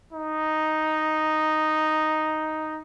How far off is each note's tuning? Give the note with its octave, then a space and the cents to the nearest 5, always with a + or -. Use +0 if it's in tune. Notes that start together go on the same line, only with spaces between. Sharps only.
D#4 +0